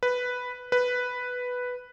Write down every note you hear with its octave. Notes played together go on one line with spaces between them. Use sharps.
B4
B4